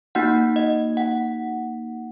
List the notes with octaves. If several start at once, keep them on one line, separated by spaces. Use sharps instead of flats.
A#3 D#4 F#4 F#5
D#5
F#5